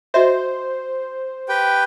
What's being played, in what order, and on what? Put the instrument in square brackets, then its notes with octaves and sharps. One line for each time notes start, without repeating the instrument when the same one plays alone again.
[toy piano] F#4 D#5 E5 [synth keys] C5
[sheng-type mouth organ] G4 B4 G5